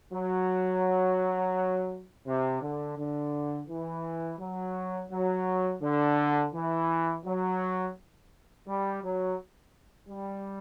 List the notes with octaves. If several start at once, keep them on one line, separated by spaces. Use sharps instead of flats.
F#3
C3
D3
D3
E3
F#3
F#3
D3
E3
F#3
G3
F#3
G3